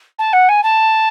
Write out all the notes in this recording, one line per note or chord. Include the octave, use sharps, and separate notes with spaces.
A5
F#5
G#5
A5